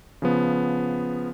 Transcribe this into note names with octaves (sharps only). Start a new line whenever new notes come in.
C#3 F3 B3